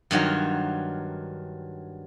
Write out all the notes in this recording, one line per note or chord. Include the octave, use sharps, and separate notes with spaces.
G2 D#3 F#3 F4